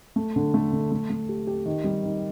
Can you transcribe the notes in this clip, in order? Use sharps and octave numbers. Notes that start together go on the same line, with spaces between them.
A3
D3
A3
D3
A3
A3
G4
G4
D#3
G3
D#3